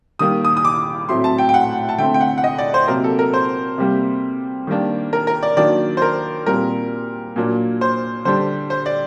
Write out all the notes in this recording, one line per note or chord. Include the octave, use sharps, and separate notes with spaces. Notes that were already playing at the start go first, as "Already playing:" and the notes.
D#3 G3 A#3 D#6
D#6
D#6
D6
A2 F#3 A3 C4 C6
A5
G5
G5
F#5
A5
D3 A3 C4 G5
G5
F#5
F#5
D#5
D5
C5
C3 F#3 A#3 A#4
A4
A#4
C5
C3 G3 A#3
D#3 G3 A#3 D4
A#4
A#4
D5
D#3 F#3 A#3 D4 D5
C5
A#4
A#2 G3 C4 A#4
A#2 F#3 A#3 D4
C5
D3 G3 D4 C5
C5
D5